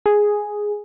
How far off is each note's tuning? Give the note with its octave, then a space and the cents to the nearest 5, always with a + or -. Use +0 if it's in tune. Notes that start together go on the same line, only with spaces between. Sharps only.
G#4 +0